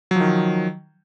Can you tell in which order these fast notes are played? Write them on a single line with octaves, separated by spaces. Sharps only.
F#3 F3 D#3